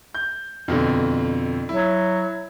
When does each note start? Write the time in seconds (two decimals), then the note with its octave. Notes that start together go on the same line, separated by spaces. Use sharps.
0.14 G6
0.68 F2 B2 D3
1.69 F#3 E4